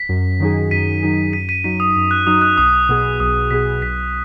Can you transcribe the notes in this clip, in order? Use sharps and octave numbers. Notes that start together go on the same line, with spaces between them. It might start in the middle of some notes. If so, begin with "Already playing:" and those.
Already playing: B6
F#2
D#3 F#3 D#4 G#4
F#2 B6 D#7
D#3 F#3 D#4 G#4
F#2 B6 D#7
B6 D#7
F#3 D#4 F#4 B6
D#6
F#2
F#6
F#3 D#4 F#4 D#6
F#6
B1 D#6
B2 B3 G#4
B1 D#6
B2 B3 G#4 B6
B1 B6